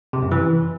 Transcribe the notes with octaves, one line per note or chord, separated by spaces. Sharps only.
C3
F#2
E3